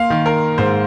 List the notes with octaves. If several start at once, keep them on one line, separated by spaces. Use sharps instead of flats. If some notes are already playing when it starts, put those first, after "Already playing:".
Already playing: A#3 F5 C6
D#3
A#4
G#2 C5